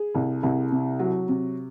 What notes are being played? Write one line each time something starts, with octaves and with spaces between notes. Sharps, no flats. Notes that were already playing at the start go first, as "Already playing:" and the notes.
Already playing: G#4
C2
C2
C3
F#3
C3